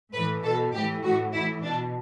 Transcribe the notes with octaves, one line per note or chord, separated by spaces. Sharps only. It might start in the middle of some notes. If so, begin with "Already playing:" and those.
A2 E3 B4
B2 A4
A2 E3 G4
A2 E3 F#4
A2 E3 E4
B2 D4